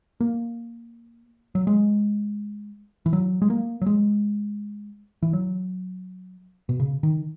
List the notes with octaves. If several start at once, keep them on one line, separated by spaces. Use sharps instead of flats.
A#3
F#3
G#3
E3
F#3
G#3
A#3
F#3
G#3
E3
F#3
B2
C#3
D#3